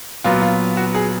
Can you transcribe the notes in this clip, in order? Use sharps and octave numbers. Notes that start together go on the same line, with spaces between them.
A#2 F#3 B3 F4
F4
F#4
G#4